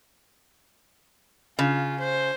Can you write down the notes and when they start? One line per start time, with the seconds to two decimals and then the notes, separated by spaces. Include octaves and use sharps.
1.59 C#3 F4
2.00 C5